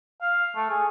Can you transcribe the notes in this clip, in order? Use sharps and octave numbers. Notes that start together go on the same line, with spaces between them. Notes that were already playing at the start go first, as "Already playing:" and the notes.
F5
A3
G#4